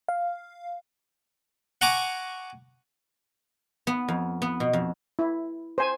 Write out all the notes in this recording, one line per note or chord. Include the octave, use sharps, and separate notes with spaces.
F5
F#5 G#5 A#5 C#6 D6
B3
F2
B3
B2
F2
E4
C5 G#5